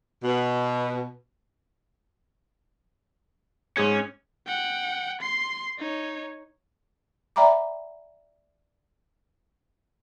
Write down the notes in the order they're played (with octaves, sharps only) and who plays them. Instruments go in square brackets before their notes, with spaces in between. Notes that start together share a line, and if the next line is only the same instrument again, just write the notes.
[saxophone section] B2
[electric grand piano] G#2 G#4 G#6 [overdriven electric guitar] C#4
[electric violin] F#5 G5
C6 C7
D#4 C#5
[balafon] D5 E5 G5 A#5 B5 D6